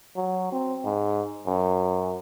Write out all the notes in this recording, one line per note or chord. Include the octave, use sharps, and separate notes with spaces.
F#3
C4
G#2
F#2